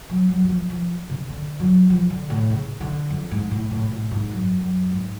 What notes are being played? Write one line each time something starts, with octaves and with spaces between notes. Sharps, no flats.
F#3
F#3
F#3
F3
F3
C#3
D3
F#3
F3
D3
A2
C#3
D3
F2
G#2
A2
A2
A2
G#2
F#2
F#2
G#2